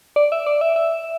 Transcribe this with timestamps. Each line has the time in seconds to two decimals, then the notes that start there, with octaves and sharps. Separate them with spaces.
0.16 D5
0.32 E5
0.46 D5
0.61 E5
0.76 E5